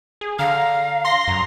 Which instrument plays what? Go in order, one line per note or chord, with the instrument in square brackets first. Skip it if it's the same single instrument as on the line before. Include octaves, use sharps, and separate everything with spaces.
[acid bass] G#4
[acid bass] D3 [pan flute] F5 [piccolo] A#5 [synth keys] F6
[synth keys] C6 A#6
[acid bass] F#2 [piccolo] A#5